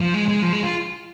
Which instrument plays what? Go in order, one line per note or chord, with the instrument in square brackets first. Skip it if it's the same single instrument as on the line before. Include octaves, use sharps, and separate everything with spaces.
[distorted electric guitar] F3
G#3
G#3
F3
G#3
F4